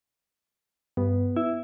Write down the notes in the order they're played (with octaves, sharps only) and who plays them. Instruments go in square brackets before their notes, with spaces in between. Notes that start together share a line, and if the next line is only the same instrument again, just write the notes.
[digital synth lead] G2 [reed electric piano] B3
[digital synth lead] E4